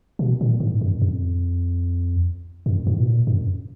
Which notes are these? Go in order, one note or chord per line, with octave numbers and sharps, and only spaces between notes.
B2
A#2
G#2
F#2
F2
F#2
G#2
B2
A#2
F#2